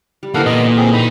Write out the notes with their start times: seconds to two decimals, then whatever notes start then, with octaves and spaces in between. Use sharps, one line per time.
0.23 G3
0.34 D3 E3 A#3 A4 F5 F#5
0.46 A#2 A#3 B3 D#5
0.65 A#3
0.77 C4 G#4
0.93 D#4 B5